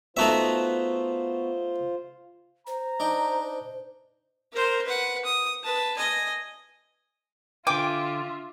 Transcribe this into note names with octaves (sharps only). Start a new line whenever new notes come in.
A3 B3 D#4 F4 F#4 C5 E5 A5
C5 A#5
D4 D#4 G5
A#4 C5
B4 F#5
D#6
B4 A5
D#5 G#5
D3 F4 E5 G5 G#5 D6